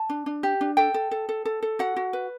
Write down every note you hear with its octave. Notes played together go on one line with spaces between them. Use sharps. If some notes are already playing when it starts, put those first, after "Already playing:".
Already playing: A5
D4
D4
G4
D4
A4 G5
A4
A4
A4
A4
A4
F#4 F#5
F#4
B4